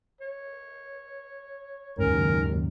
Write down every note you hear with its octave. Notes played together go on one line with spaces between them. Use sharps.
C#5
F#1 D#2 G#2 C#4 A#4